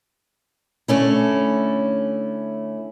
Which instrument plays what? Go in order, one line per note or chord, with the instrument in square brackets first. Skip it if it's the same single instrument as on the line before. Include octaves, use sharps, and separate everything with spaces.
[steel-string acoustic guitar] D3 A3 C#4 E4